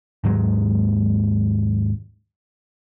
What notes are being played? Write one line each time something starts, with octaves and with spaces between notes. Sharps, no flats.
D#2 G#2 F#3 G#3